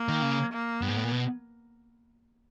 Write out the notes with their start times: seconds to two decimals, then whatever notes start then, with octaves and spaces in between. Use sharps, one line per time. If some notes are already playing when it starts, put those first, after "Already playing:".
Already playing: A#3
0.08 D#3
0.22 C#3
0.52 A#3
0.82 G2 B3
0.89 G#2
0.97 A2
1.04 A#2
1.12 B2